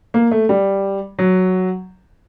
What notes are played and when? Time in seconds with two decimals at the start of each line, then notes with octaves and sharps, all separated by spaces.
0.14 A#3
0.31 A3
0.49 G3
1.19 F#3